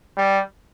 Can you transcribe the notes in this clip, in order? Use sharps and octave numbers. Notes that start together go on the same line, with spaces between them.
G3